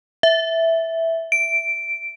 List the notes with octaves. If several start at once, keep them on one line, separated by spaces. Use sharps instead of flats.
E5
D7